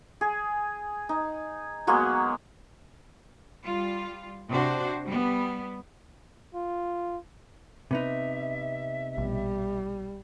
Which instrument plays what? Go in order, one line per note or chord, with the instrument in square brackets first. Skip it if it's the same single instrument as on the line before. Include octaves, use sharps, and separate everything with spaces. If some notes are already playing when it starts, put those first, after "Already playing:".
[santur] G#4
D#4
F#3 G#3 A#3 B3
[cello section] G3 F4
C3 D4 F#4 C5
G3 B3
[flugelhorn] F4
[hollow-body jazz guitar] C3 B3 D#4 [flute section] E5
[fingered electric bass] A#1 B2 [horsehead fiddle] G3